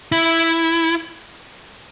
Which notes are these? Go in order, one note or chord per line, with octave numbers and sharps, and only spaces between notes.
E4